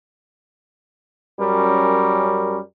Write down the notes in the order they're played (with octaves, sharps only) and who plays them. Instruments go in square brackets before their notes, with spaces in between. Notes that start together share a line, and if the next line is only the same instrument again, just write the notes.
[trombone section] F#2 G3 C#4 A#4